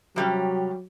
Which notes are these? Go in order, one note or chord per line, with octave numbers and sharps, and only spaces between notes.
C3 F#3 G3 C#4